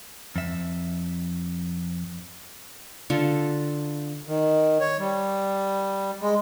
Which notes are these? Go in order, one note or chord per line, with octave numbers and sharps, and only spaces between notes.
F2 E5
D3 F4 A4
D#3
C#5
G3
G#3